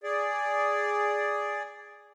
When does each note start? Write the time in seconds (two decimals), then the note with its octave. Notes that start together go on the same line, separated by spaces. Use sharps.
0.03 G#4 D5